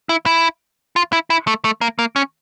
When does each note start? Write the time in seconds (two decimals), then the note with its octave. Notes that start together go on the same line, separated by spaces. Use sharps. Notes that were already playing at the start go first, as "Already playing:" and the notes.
0.09 E4
0.26 E4
0.96 F4
1.13 E4
1.30 E4
1.47 A3
1.65 A3
1.81 A#3
1.99 A#3
2.16 C#4